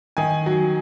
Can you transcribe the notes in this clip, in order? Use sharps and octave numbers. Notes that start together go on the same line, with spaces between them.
D#3 G#5
F#3